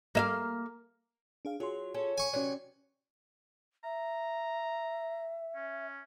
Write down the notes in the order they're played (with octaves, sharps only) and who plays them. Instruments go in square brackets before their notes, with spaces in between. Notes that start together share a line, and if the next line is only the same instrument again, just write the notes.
[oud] A#3 E5 F5
[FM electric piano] D4 G#4 F5
[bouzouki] F#3 [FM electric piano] F4 G#4 C6
[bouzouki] C#4 A4
[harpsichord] G#5 C#6
[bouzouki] C3 E3 F#3 [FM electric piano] C#4 D5
[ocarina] E5 [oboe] A#5
[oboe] C#4